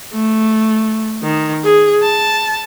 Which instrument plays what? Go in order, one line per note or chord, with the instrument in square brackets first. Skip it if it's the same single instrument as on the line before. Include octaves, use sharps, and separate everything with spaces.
[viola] A3
D#3
G#4
A5